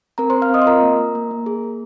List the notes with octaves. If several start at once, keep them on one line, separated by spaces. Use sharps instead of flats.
C4 A#4 A#5
C5 C6
C4
F5 F6
C4 D#5 D#6
C6
F4 A#4 A#5
A#3
A#3
A#3
A#3
G#4
A#3